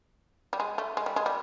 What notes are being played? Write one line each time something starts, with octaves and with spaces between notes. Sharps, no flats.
G3
G#3
A3
G#3
G3
G#3
G3